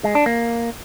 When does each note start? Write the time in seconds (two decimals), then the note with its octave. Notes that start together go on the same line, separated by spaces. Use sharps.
0.04 G#3
0.15 D4
0.26 A#3